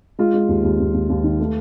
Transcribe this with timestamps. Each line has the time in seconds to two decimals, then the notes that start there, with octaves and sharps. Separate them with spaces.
0.19 G#3 F4
0.34 G#3
0.48 D#2
0.64 D#2
0.80 D#2
0.94 D#2
1.09 D#2
1.24 D#3
1.40 A3